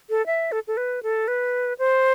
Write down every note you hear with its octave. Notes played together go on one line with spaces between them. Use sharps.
A4
E5
A4
A4
B4
A4
B4
C5